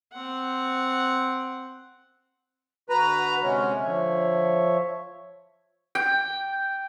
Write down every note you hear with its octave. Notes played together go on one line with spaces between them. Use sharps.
C4 F#5
D3 F#4 B4 A#5
C3 G#3 C#4
D3 F3 C#5 E5
G5